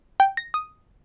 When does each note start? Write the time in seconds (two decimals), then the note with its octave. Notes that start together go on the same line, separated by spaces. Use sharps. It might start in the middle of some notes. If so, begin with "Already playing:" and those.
0.20 G5
0.37 A#6
0.54 D#6